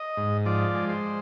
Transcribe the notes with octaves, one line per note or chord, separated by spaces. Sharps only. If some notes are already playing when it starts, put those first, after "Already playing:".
Already playing: D#5
G#2
F3 D5
G#3
C5